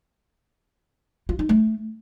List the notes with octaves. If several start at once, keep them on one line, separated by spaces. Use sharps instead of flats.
F4
D#4
A3